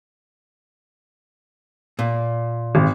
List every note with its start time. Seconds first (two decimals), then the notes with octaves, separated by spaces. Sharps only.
1.99 A#2
2.75 G#1